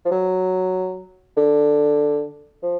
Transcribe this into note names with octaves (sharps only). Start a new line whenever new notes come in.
F3
F#3
D3
F3